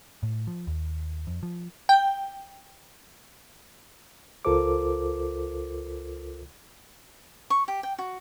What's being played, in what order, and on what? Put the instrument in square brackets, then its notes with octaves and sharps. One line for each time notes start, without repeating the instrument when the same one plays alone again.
[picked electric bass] A2
F3
D#2
F2
F3
[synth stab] G5
[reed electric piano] C#2 F4 A4 A#4 C5 D6
[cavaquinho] C#6
G4
G5
F#4